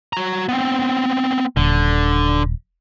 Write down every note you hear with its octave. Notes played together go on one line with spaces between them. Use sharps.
F#4 A#5
B3 C4
D#1 D3